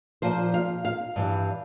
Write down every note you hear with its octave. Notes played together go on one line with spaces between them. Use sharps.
A#2 F3 C5
F5
F5
G2 E3 G3